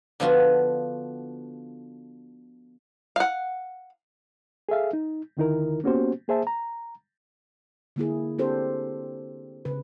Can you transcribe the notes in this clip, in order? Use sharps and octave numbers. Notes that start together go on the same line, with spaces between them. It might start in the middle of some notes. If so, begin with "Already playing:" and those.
D3 F3 B3 F4 F#4
F5 F#5
G#4 A4 E5 F5
D#4
D#2 D3 D#3 D#4 E4 A#4
A#3 B3 C#4 F#4 G4 C5
A#3 G#4 C5 E5 A5
A#5
D3 A#3 E4 G#4
C4 D4 G4 A4 C5
C#3 B4